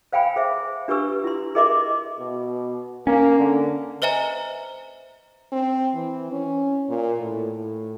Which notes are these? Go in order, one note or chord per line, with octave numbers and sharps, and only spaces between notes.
C5 F5 G5 G#5 B5
G#4 C5 E5
D4 G4 B4 C#6 E6
E4 C6
G#4 A#4 D#5 E5 C6 D6
B2
A#3 C#4
D3
B4 C5 D#5 E5 G#5 A#5
C4
E3
C#4
A#2
A2
A2